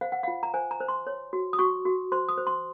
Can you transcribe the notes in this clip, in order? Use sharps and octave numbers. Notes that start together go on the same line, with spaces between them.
C5 F5
F#5
F4 F5
A#5
C5 G#5
A#5
C5
C6
C#5
F#4
D#6
F#4 C#6
F#4
C5 C6
D#6
C5
C6